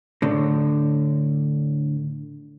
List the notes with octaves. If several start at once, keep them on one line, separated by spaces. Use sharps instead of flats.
A2 D3